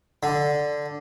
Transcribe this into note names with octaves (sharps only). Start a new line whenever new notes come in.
D3